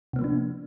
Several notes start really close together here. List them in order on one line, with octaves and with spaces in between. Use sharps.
C3 B3 A#3 F3 D4